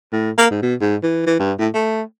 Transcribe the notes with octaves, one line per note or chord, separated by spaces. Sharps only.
A2
A#3
G#2
B2
G#2
E3
E3
G2
A2
A3